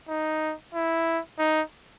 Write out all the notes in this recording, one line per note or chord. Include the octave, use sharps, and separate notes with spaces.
D#4
E4
D#4